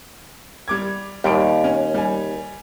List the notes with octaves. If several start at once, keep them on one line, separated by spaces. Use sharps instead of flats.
G3 D6 G#6
D#2 G3 D7
C#4
G3 G#5